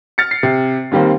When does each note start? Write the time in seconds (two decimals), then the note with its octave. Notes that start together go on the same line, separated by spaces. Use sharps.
0.18 F6 A6 C#7
0.31 C7
0.43 C3
0.91 D#2 D#3 G3 A#3 C4